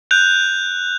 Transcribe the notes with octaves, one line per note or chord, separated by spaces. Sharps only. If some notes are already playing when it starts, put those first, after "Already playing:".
F#6 G6 F7